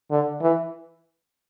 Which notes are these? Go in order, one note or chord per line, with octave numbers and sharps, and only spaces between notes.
D3
E3